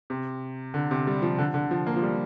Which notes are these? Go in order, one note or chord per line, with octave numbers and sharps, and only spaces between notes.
C3
D3
C3
G3
F3
D3
D3
F3
A#3
F3
G3